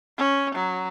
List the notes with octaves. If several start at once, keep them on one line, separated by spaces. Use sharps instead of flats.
C#4
F#3